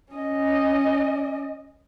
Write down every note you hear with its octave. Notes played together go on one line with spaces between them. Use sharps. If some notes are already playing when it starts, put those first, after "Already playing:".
C#4 D#5